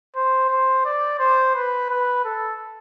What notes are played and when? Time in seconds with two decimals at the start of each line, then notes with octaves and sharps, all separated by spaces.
0.16 C5
0.50 C5
0.86 D5
1.20 C5
1.55 B4
1.90 B4
2.25 A4